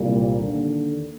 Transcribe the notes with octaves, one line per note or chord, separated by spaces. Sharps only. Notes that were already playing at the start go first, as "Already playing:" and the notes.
Already playing: C2 A#2 G3
D#2 D3